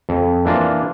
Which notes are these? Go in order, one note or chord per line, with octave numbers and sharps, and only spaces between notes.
F2
E3 A#3 D4 F4